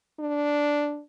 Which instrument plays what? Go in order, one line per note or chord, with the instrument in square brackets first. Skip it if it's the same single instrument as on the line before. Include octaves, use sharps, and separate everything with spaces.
[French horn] D4